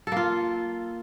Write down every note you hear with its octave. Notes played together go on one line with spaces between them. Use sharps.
A#3 F4 A4